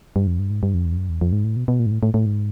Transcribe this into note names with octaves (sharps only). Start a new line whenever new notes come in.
G2
F2
G2
G#2
G2
F2
E2
F2
F#2
E2
F2
G#2
A2
B2
B2
A#2
G#2
A2
A2
A2
G#2